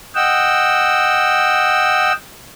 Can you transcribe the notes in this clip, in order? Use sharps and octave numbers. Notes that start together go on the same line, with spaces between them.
D#5 F#5 G5 E6